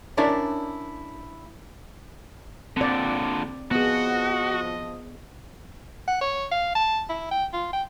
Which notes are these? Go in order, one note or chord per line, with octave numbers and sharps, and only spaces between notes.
C#4 D4 E4 A#4 C#5 D5
A#2 D3 C4 D5
F3 B3 F#4 G#4 D#5
F#5
C#5
F5
A5
E4
G5
F4
G5